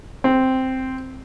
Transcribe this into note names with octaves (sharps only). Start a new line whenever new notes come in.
C4